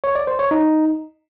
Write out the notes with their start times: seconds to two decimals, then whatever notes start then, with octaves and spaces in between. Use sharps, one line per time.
0.04 C#5
0.15 D5
0.27 C5
0.39 C#5
0.51 D#4